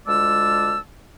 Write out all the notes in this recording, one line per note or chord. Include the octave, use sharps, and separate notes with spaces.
D2 G#3 F4 D5 A5 E6